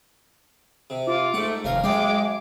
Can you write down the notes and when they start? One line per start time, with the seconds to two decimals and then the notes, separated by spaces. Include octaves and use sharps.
0.90 C3
1.07 F4 D6
1.34 G#2 A3 F#5
1.65 F1 D#2 A#4 F5 G#5
1.84 F#2 G#3 F5 G5 D6